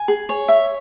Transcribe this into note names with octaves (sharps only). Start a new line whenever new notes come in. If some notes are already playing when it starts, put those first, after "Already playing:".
Already playing: G#5
G#4
C#5
E5